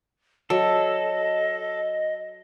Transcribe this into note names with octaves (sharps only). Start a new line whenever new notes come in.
F#3 A4 D#5